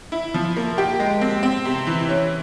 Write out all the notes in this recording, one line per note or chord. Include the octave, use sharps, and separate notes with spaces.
E4
F3
A#3
G4
G#3
C4
C4
C3
E3
C#4